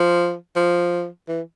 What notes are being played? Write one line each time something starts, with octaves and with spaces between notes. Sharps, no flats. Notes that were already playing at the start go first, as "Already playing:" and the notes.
Already playing: F3
F3
E3